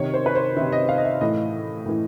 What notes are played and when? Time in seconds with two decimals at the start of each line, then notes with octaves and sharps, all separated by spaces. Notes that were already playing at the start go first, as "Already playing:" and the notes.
Already playing: C3 D#3 C#5
0.14 C5
0.26 B4
0.35 C5
0.57 C3 D#3 E5
0.72 D#5
0.89 F5
0.98 D#5
1.05 E5
1.21 A2 E3 D#5
1.86 A2 E3